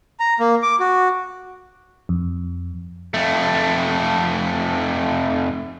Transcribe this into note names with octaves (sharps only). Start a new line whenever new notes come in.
A#5
A#3
D6
F#4
F2
F2 A3